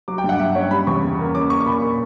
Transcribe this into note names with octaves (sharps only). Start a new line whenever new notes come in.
F#3 D6
G5
G2
F#5
G2 E5
C#4 C#5
G3 B5
E2 C#6
C#3
A#3
C#4 D6
A#3 C#6
C#6
A#2 B5
A#3 C#6